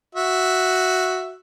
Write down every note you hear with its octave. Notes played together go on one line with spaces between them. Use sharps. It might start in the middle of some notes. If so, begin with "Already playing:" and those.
F#4 E5